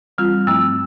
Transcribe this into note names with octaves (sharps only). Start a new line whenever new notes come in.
E3 G3 C4 F4 F6
G2 F3 A3 C4 E4 E6